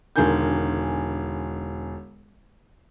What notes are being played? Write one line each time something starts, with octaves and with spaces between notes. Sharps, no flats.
E1 D3 D#3 G#5 G6